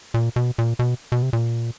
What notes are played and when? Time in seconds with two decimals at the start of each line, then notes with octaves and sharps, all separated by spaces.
0.14 A#2
0.36 B2
0.58 A#2
0.79 B2
1.12 B2
1.22 C3
1.33 A#2